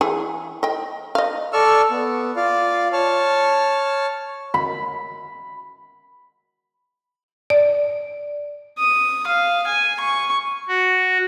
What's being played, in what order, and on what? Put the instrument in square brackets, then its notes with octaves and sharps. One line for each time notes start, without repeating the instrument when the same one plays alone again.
[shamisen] E3 G#4
D#5 G5
D#5 F5
[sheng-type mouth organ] A4 D5 C#6 E6 F6
B3
F4 D5 F5
C#5 A5 F6
[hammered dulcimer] B5
[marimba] D5
[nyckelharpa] D#6
F5
G#5
C#6
[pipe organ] F#4